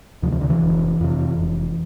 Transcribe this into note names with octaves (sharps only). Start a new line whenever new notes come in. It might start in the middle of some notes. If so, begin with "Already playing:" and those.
D2 C3 F3
E3
D3
E3
F1
F2 C3
F1